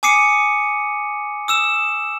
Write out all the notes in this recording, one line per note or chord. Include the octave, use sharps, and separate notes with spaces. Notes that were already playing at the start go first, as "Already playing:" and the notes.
G#5 D6 D#6 C7 C#7 D#7
D#6 E6 E7